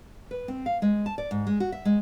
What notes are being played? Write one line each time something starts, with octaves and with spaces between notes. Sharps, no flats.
B4
C4
F5
G#3
A5
D5
G#2
G#3
F#4
E5
G#3